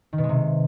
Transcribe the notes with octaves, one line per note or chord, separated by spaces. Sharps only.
D#3
B2
G#3
C3